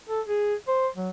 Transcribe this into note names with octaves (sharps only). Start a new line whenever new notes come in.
A4
G#4
C5
F#3